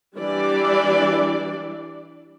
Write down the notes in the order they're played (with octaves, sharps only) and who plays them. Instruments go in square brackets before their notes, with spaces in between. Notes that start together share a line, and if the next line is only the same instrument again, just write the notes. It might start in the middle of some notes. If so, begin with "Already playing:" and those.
[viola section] E3 G3 D4 D5